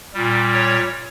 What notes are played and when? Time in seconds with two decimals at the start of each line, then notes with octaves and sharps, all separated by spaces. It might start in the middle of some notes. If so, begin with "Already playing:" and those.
0.14 A#2 G3
0.53 C#5